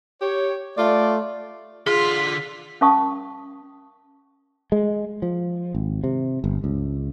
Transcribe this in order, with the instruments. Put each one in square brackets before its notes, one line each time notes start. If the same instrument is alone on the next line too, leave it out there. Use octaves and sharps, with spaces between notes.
[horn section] G4 C#5
A3 F4 D5
[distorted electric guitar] D3 C6 [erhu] F4 [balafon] G#4 [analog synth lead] B6
[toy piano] C#4 A#4 F5 A5 C#6 D#6
[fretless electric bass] G#3
F3
G#1
C3
G1
C#2